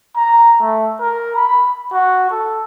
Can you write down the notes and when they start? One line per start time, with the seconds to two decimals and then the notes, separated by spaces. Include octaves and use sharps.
0.16 A#5
0.61 A3
1.00 A#4
1.36 B5
1.92 F#4
2.31 A4